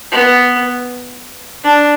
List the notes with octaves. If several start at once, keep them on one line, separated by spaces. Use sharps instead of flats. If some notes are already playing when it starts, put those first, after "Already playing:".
B3
D4